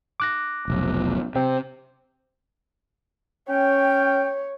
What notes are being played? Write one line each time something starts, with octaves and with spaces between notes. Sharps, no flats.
D6 F#6 A#6
F1 B1
C3 C4
C#4 C#5 G5